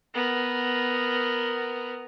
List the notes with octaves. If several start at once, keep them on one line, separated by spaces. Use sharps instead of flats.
B3 A#4